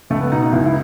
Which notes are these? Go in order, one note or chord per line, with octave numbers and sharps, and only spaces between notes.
C#2 A3
B3
B2 D#4
D#4
C#2 E4
E4